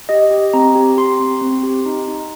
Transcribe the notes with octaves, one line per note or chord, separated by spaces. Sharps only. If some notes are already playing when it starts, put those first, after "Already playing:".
G4 D#5
G4
C4 A#5
G4
G4 C6
C4
C4
G4
D#4
D#4